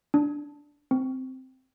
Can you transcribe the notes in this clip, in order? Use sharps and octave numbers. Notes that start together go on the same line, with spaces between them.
D4
C4